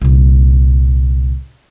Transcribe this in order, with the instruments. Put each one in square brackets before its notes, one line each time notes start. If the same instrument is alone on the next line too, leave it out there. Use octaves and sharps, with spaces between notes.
[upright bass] C2 A#2